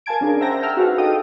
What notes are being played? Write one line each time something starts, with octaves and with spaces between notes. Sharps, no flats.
A#4 F5 G#5 A5 G#6 D7
C#4 D4 G#4 A#4
C5 E5 F#5 G5 A#5 A#6
G5 A5 E6 F6
D#4 F#4 G#4 B4 F5 F#5
A4 D#5 G5 D#6